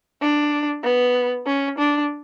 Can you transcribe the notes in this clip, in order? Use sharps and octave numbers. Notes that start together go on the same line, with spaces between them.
D4
B3
C#4
D4